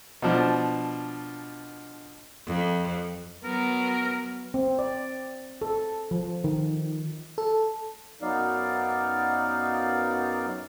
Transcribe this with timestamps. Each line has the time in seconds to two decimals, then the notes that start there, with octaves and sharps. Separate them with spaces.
0.22 B2 F3 D4
2.46 F2
3.44 F#3 B3 A#4
4.54 C4
4.79 D5
5.62 A4
6.11 F3
6.44 D#3
7.38 A4
8.22 F#2 F#3 B3 D#4 D5 F5